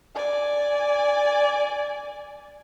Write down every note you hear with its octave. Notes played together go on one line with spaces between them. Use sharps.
D5 G#5